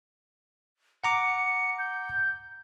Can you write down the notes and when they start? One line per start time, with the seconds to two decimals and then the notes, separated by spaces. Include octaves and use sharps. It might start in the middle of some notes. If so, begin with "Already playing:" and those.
1.04 F#5 A#5 D6 C#7
1.79 G6